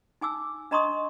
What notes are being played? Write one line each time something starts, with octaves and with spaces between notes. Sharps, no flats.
D#4 G#5 D6 E6
D4 D#5 A#5 C6 C#6 D#6